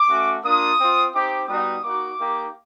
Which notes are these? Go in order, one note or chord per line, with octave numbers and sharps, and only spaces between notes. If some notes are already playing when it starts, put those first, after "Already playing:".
Already playing: D6
A3 C#4 F#4
A#3 D4 F4 D#6
C4 F4
C4 D#4 G4 D6
G3 B3 D#4 F#4 D#6
A#3 D#4 F#4 D6
A#3 D#4 G4